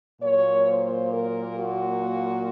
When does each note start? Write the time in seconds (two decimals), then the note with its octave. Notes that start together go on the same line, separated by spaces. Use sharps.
0.21 A#2 F#3 A#3 C#5
0.67 C5
1.13 A#4
1.59 F#4